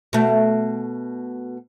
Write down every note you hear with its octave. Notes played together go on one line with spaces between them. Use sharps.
B2 A3